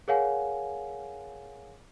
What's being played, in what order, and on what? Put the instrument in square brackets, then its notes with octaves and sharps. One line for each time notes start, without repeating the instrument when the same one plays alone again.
[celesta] G#4 A#4 C#5 F5 F#5 G#5